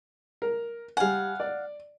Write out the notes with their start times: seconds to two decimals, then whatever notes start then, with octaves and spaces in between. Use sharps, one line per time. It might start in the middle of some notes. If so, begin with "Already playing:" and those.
0.42 A#4
0.97 G3 F5 F#5 G#5
1.40 D5